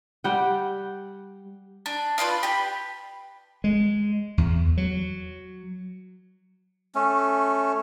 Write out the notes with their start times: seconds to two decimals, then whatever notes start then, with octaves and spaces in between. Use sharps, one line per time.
0.24 G3 F#5 G5
1.86 D4
2.18 F4 B4 D5 F5
2.43 G4 B4
3.64 G#3
4.38 E2
4.77 F#3
6.95 A3 C#4